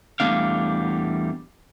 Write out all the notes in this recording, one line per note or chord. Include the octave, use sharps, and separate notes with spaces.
E2 G#2 G3 A3 D4 F5